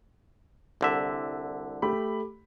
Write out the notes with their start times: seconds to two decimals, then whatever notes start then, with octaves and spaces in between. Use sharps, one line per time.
0.81 C2 D3 E5
1.82 A3 G4 B5